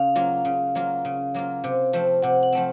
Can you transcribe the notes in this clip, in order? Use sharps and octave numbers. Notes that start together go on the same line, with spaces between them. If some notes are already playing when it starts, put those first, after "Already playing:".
Already playing: C#3 F5
F#3 A#3 F4
C#3
F#3 A#3 F4
C#3
F#3 A#3 F4
C3
F3 A3 C4
C3 F#5
F#5
F3 A3 C4